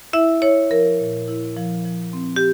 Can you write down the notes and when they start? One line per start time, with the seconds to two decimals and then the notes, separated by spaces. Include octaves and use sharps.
0.13 E4 E5
0.42 E4 C#5
0.71 F3 A#4
1.00 A#2
1.28 E4
1.56 F3
1.85 F3
2.13 C4
2.36 G4